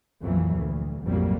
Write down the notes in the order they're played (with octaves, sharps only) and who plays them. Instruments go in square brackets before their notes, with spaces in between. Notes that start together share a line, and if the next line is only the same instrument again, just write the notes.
[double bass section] A#1 F2 E3 F#3 A#3
D2
A#1 F2 G#2 F#3 G3 A#3